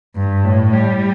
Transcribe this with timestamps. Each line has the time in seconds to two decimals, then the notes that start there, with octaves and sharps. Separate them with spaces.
0.16 G2
0.44 A2
0.73 G3